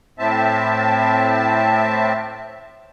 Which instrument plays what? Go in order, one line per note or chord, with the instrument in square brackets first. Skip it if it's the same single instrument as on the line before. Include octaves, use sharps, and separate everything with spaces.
[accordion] A2 C4 E5 A5